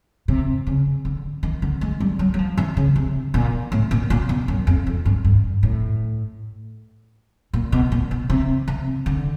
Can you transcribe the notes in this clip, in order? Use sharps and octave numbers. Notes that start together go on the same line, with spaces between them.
C3
C#3
D3
D#3
D3
G#3
G3
F#3
F#3
F3
E3
C#3
C3
A#2
A2
A#2
A#2
B2
F#2
F2
F2
G2
G2
A2
A#2
B2
A#2
B2
C3
C3
D3